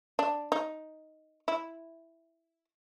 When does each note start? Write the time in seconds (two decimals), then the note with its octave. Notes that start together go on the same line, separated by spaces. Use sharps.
0.19 D4
0.52 D#4
1.48 E4